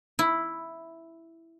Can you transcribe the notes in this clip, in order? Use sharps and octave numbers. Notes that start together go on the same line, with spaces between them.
E4